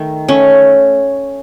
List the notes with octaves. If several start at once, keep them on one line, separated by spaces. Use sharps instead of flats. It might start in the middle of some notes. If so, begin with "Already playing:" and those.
Already playing: D#3 A3
A3 C#4